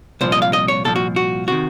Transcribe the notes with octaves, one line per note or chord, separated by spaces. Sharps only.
C2 A#2 F3 C5
D#5
F5
D#5
C#5
C2 A#2 F3 A4
F#4
F#4
C3 D#3 F#4